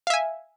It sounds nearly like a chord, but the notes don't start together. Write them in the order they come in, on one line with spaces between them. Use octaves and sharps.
F5 E5 G#5